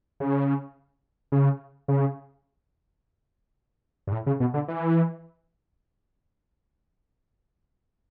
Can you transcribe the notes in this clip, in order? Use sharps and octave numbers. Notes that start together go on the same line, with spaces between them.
C#3
C#3
C#3
G2
A2
C#3
B2
D3
E3